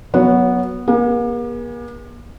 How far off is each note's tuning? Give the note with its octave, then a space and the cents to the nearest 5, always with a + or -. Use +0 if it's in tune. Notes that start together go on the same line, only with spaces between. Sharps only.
F#3 +0 B3 -10 C#5 +20
A#3 +45 G#4 -30